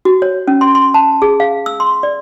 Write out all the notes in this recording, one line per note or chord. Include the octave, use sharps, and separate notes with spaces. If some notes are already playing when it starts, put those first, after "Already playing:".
F#4
C#5
C#4
C6
C6
A5
G#4
F5
E6
C6
D5